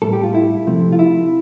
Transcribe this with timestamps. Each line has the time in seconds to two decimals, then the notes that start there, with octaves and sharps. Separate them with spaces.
0.02 A2 G3 A4
0.13 G4
0.23 F4
0.35 E4
0.67 C3 F3 A3
0.92 F4
0.99 E4